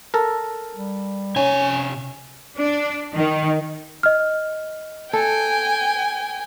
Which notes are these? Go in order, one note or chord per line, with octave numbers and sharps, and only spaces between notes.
A4 A#4
G3
C3 C#4 C#5 G#5
D4
D#3
D#5 F6
A4 G5 G#5